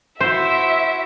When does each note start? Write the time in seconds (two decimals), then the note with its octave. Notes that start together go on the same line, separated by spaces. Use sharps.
0.21 E4 F#4 C5 E5